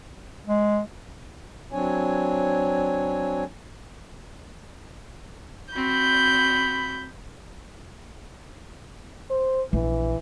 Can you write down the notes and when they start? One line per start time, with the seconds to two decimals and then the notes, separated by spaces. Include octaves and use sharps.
0.47 G#3
1.73 F#3 C4 D4 C#5 G#5
5.74 C4 F#4 B5 G6
9.30 C5
9.73 A#1 E3